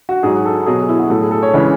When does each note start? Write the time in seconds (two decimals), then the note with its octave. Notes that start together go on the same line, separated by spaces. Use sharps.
0.09 F#4
0.23 G#2 F#3 G#4
0.45 A4
0.66 B2 F#3 G#4
0.89 E4
0.99 F#4
1.10 A2 F#3 A4
1.21 G#4
1.31 A4
1.43 C#5
1.54 C#3 E3 G#3